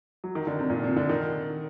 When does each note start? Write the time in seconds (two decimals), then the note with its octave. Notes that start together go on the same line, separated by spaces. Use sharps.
0.24 F#3
0.35 D#3
0.47 D3
0.59 C3
0.70 A#2
0.84 C3
0.96 D3
1.09 D#3